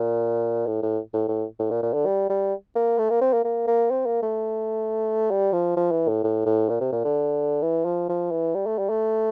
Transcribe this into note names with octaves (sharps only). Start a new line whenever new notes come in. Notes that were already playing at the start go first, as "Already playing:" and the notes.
Already playing: A#2
A2
A2
A2
A2
A2
A#2
A#2
D3
G3
G3
A#3
A3
A#3
C4
A#3
A#3
A#3
C4
A#3
A3
G3
F3
F3
E3
A2
A2
A2
A#2
C3
A#2
D3
E3
F3
F3
E3
G3
A3
G3
A3